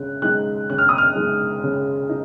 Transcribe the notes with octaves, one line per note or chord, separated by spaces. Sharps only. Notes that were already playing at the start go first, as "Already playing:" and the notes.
Already playing: C#3 G#3 F#6
G#3 D#4 F#6
C#3 F#6
F6
D#6
F6
G#3 D#4
C#3
D#4